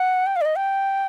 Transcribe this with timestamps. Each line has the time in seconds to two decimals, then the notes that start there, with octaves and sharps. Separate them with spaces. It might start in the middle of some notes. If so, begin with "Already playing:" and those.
Already playing: F#5
0.27 G5
0.36 F5
0.41 D5
0.46 D#5
0.56 G5